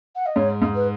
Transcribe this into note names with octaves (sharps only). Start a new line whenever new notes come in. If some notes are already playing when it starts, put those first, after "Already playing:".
F#5
D#5
G#2 C#5
G#2
B4